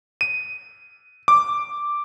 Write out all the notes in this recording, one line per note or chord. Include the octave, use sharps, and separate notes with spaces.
D#7
D6